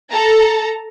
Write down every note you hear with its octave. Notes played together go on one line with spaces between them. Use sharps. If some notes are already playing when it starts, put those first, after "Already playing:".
A4 A5 A#5